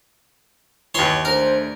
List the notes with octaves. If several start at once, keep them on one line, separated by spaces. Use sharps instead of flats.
D#2 E3 C#5 C6
A3 D4 A#4 C5